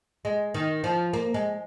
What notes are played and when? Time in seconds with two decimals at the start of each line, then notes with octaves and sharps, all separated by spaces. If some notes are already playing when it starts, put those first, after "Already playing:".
0.25 G#3
0.54 D#3
0.84 F3
1.13 A#3
1.34 G#3